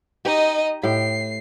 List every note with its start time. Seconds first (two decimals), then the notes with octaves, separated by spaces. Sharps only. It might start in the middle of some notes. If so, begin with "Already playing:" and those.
0.25 D#4 G4 D#5
0.83 A2 G4 G5 C7